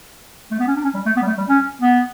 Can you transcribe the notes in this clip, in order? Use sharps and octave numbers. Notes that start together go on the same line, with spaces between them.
A3
B3
C#4
D4
C#4
G3
A3
B3
G3
A3
G3
C#4
B3